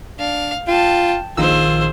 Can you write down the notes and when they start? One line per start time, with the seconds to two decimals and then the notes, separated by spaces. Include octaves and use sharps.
0.19 D4 F5
0.68 F4 G5 A5
1.37 A#1 D#3 F4 G#4 C5 E6